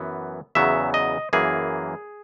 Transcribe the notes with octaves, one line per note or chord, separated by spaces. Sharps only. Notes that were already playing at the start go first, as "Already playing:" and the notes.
Already playing: F#2 E3 B3
E2 C#3 F#3 B3 E5
D#5
F#2 E3 A#3 G#4